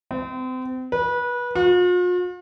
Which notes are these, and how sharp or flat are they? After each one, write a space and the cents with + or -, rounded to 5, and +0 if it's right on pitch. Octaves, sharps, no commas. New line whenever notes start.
C4 -35
B4 -25
F4 +45